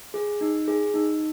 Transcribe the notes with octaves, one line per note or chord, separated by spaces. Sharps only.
G#4
D#4
G#4
D#4